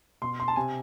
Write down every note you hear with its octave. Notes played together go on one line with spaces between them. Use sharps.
B2 C6
C6
A5
C3 G#5